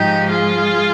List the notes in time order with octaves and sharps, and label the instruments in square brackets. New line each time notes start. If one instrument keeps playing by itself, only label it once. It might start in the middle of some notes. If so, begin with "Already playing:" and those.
Already playing: [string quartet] G#2 F3 G#3 D#4 G4
F4 G#4